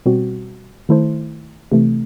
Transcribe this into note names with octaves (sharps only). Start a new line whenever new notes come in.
B2 G3 C4 F#4
D#3 A3 E4 A4 C5
C3 E3 A3